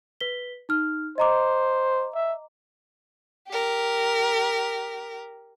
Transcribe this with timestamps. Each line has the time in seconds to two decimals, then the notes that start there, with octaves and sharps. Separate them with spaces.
0.20 B4 B6 G7
0.69 D#4 F6
1.18 C5 D#5 A#5 D6
2.15 E5
3.48 G4 A#4